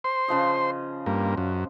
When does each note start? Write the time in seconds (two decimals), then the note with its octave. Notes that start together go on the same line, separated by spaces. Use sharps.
0.04 C5 C6
0.28 C#3 F3 D#5
1.06 G2 A#3
1.37 F#2